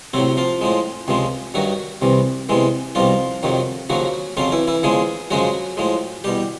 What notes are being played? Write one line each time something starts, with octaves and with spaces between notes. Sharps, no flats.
A2 C3 F#3 C4
F3 F4
A2 F3 G#3
C#2 C3 F3 G#3
G2 D#3 F#3 F#4
C2 C3 E3
E2 C3 E3 G#3
C2 B2 F3 G3 F4
F2 C3 D#3 F#3
D#2 C#3 F3 F#3 F#4
F2 C#3 F3 F#3 F4
E3 E4
E3 E4
E2 C#3 F3 G#3 G#4
F#2 C#3 F3 F#3 G#3 F#4
A2 F3 G#3
E2 B2 G3 G4